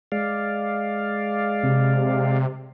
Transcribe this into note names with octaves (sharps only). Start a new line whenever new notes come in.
G#3 D5 F5
C3